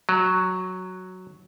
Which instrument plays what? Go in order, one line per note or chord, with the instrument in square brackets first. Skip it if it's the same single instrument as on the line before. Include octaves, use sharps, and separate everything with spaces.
[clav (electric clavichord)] F#3